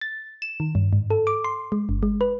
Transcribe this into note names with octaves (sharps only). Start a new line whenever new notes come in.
A6
E7
D#3
G2
G#2
A4
D6
C6
G#3
G1
G#3
B4